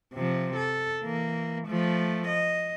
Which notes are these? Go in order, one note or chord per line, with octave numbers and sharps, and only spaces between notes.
C3 F3
A4
E3 A#3
F3 A3
D#5